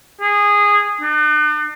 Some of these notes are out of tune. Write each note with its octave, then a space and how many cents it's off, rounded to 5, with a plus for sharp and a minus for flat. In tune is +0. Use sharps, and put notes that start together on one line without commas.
G#4 -15
D4 +45